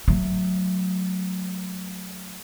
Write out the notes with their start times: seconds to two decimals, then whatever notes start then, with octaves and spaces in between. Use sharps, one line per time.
0.08 F#3 A3